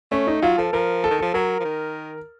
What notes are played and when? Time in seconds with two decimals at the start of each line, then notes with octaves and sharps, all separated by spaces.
0.11 A3 C#4
0.27 D#4
0.42 F#3 F4
0.58 F3 A4
0.73 F3 A#4
1.04 A4
1.11 D#3
1.19 F3 A4
1.34 F#3 A#4
1.60 F3
1.65 D#3